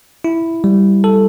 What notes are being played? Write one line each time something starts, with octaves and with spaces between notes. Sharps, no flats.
E4
G3
A4